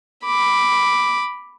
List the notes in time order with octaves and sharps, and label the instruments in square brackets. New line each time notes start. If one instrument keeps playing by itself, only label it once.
[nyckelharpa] B5 D6